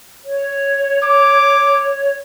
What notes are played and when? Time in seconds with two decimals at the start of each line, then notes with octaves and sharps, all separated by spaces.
0.25 C#5
1.03 D6